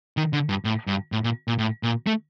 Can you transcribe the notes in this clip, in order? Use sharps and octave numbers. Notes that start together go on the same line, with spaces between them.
D#3
D3
G2
A2
G2
A2
A#2
A#2
A2
A#2
A3